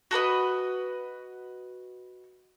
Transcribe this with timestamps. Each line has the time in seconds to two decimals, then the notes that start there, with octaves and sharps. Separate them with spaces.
0.11 F#4 A4 B4 D#5